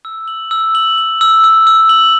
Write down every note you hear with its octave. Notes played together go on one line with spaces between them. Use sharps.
E6
F#7
E6
F#7
F#7
E6
E6
E6
F#7